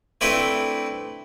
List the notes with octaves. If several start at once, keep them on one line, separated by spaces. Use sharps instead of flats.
A3 C4 D4 E4 B4 G5